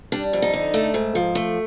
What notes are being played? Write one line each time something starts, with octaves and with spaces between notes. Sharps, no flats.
G3 D4
F2
D#4
D3
A3
G#2
F3
A3